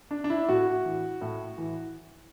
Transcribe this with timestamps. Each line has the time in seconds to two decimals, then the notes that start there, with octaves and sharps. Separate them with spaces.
0.11 D4
0.24 D4
0.30 E4
0.49 A2 F#4
0.85 E3
1.21 A2
1.57 E3